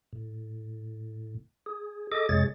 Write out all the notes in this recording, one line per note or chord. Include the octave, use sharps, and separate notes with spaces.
A2
G#4
G#4 A4 D#5 D6
F2 C3 G#3 G#4 C#5 A6